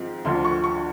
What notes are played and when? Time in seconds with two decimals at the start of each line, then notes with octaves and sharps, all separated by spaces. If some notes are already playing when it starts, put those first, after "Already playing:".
Already playing: G#2 F3 C4
0.25 D2 D3 F3 C6
0.45 C#6
0.64 C#6